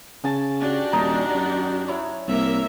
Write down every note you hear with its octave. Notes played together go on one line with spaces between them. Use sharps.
C#3 G#5 A5
D4 F#4 G4
D#1 D#4 A#5
F#2
E4 C#5
C2 A#3 E5